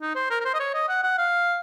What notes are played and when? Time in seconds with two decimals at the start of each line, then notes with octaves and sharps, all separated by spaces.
0.02 D#4
0.16 C5
0.31 A#4
0.41 A#4
0.45 C5
0.55 D#5
0.60 C#5
0.75 D#5
0.89 F#5
1.04 F#5
1.18 F5